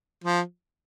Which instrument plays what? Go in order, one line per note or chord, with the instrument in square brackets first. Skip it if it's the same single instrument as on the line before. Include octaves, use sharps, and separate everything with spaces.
[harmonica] F3